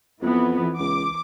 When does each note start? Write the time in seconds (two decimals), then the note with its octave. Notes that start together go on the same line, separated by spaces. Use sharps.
0.22 F2 E3 B3
0.80 C#2 D6